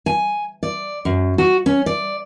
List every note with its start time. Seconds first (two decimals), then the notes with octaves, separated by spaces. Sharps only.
0.06 G#5
0.63 D5
1.05 F#2
1.38 F#4
1.66 C#4
1.86 D5